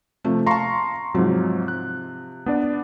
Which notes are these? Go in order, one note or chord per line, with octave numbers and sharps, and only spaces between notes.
C3 F3 A3
F5 A5 A#5 C6 C#6
G#2 C3 F3 F#3
F#6
B3 D4 D5